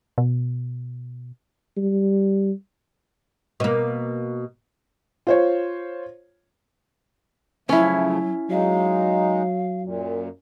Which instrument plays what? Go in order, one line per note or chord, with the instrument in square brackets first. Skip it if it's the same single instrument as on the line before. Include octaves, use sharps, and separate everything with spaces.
[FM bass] B2
[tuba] G3
[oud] B2 A#3
[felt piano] F4 C5 C#5
[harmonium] C#3 F3 A3 [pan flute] F#3 [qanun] C#4 E4
[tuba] F#3 [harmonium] G#3 D#4 [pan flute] F5
[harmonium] F#2 A#2